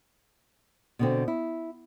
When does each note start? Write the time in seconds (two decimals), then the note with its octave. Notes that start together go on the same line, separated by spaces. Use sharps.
0.99 B2 D3 C4
1.28 E4